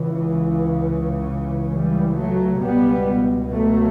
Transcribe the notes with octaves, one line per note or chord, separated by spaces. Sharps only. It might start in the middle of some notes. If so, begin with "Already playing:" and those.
Already playing: C#2 C#3 E3
E3 G3
F#3 A3
C#2 B2 G3 B3
F#3 A3